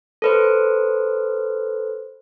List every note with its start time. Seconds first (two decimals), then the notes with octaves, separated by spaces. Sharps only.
0.22 A4 B4 C5